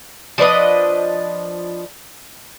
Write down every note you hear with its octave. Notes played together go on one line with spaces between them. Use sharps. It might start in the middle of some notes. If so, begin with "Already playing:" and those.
F3 D4 B4 D#5